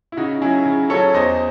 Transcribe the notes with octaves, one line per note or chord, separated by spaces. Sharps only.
E4
C#3 D#4 F#4
F#3 C#4 E4 G#4
C#3
F#3 C#4 A4 C#5
E2 C5 D#5